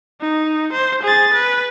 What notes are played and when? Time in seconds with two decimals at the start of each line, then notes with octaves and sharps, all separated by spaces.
0.21 D#4
0.73 C5
1.03 G#4 A6
1.34 B4